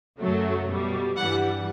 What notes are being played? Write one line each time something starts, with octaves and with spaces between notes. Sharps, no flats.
F#2 C#3 F#3 A3
B2 G3
G2 E3 G3 F#5